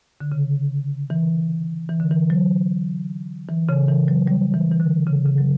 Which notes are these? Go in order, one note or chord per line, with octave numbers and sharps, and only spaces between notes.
D3
C#3
E3
E3
D3
E3
F#3
E3
C#3
E3
F#3
G3
E3
E3
D3
C#3
C#3
F#3